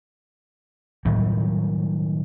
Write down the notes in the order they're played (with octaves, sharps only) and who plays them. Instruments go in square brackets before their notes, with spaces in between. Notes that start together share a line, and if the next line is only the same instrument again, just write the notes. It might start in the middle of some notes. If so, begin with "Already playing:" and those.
[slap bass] A2 D#3 F#3 G3